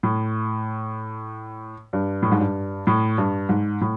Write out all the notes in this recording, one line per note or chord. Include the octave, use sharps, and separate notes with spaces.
A2
G2
A2
G#2
G2
A2
G2
G#2
A2